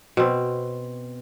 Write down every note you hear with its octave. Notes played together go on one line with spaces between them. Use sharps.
B2 C4